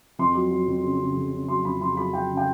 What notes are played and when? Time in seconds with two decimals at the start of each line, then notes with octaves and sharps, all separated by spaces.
0.19 F2 C6
0.35 F#3
0.51 F#3
0.68 F2
0.84 C#3
1.00 C#3
1.17 F2
1.32 C#3
1.48 F#3 C6
1.65 F2 B5
1.81 F2 C6
1.97 F#3 B5
2.13 F#3 G5
2.30 C#3
2.37 G5